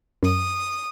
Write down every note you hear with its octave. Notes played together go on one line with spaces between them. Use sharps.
F#2 D#6